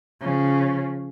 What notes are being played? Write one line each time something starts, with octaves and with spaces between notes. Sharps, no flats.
C#3 F3